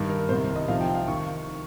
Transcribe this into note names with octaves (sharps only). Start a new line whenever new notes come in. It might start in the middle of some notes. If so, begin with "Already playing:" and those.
Already playing: G2 D#3
A#4
C2 C3 D#3 C5
D#5
C2 C3 F3 F5
G5
F5
D#3 C#6